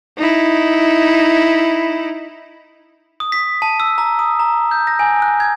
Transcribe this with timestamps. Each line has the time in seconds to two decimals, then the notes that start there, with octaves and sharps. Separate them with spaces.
0.17 D#4 E4
3.20 D#6
3.32 B6
3.62 A5
3.80 E6
3.98 A#5
4.19 D#6
4.39 A#5
4.71 G6
4.87 A#6
4.99 G#5
5.22 F#6
5.40 G#6